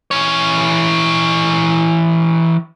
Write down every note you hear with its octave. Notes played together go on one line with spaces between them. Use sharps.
E3 C#5